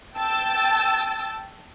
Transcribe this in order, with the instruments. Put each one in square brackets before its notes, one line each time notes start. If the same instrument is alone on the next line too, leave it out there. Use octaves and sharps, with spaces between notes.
[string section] G5 A5 E6 A6